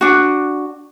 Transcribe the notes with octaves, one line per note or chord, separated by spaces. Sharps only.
D4 F#4